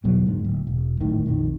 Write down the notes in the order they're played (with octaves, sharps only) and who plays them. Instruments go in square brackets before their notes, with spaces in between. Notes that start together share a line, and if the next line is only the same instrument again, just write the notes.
[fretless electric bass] G1 E2 B2 F#3
D1 G#2 A#3 D4
D1
E1
D1 G#1 A2 D#3
A#1 F2 D#3